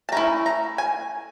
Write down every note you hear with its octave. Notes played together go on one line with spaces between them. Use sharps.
A5
A3 C#4 E4 A#5
A#5
G#5